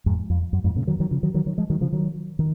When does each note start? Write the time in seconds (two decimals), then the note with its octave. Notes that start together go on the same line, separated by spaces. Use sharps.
0.06 F2 G#2
0.30 F2
0.53 F#2
0.64 F2 G#2
0.76 A#2 C#3
0.87 D#3 F#3
1.00 D#3 F#3
1.11 C#3 F3
1.23 D#3 F#3
1.34 D#3 F#3
1.46 D#3 F#3
1.58 F3 G#3
1.70 D#3 F#3
1.81 C#3 F3
1.92 D#3 F#3
2.39 D#3